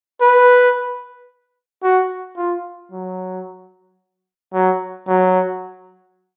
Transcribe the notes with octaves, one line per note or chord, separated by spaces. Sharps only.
B4
F#4
F4
F#3
F#3
F#3